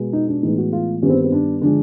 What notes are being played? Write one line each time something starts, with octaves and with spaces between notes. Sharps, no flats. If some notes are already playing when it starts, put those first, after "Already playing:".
Already playing: B2 G#3 B3
D#4
D4
A2 E3 G#3 B3 D#4
F#4
F4
G2 D#3 G3 B3 C#4
C4
C4
D4
D3 F3 G#3 D4